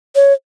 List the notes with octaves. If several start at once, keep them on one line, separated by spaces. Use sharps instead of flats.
C#5